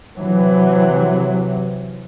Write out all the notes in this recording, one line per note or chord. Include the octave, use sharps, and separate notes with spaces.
C3 E3 F#3